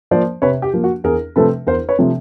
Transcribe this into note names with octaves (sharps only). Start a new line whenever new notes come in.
F3 A#3 C5 D5
C3 B4 C#5
G4
F3 A#3
F#4
E2 G#4 A#4
C3 F3 A3 C4 A4 B4
E2 A#4 C5
B4 C#5
C3 F3 A3 C4